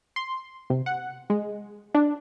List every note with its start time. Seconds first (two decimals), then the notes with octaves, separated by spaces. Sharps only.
0.16 C6
0.70 C3
0.86 F#5
1.30 G#3
1.94 D4